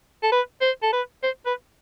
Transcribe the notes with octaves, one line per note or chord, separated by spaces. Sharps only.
A4
B4
C5
A4
B4
C5
B4